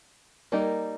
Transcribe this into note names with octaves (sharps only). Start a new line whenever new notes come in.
G3 A#3 D#4 A#4